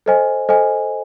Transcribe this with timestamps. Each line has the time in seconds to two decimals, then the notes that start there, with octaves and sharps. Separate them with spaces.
0.06 A4 C5 D#5 G#5
0.49 A4 C5 D#5 G#5